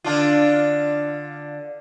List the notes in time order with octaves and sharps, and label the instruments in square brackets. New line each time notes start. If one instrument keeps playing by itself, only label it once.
[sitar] D3 D4 F4